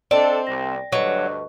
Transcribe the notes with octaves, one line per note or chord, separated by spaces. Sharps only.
C4 D4 A4 D5 D#5
C2 A#6
D2 G2 F#3 B4 D#5 C#6